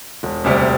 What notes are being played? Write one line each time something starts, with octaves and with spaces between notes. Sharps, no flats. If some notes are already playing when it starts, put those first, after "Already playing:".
E1
D2 C3 G3